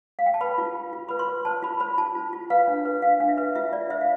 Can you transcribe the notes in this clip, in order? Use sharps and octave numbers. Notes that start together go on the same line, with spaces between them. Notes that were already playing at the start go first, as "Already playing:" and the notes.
F5
G5
A5
B4 B5
F4
F4
F4
B4 B5
C6
B4
C5 A5
F4 B5
C5 B5
F4 A5
F4
F4
B4 F5
D4
B4
D4 F5
D4 F5
E5
B4
F4 E5
F4 D5
C5 E5
F5